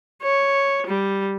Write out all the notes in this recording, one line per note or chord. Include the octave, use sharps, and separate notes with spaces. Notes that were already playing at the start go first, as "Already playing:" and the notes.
C#5
G3